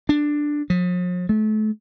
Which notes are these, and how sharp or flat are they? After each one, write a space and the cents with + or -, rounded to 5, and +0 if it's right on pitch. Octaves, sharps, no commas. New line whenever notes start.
D4 +5
F3 +45
A3 -35